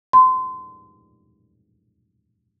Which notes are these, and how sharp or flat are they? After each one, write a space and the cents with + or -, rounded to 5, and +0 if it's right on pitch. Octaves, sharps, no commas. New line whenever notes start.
C6 -30